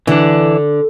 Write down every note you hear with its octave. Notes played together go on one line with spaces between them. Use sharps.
D3 E3 D4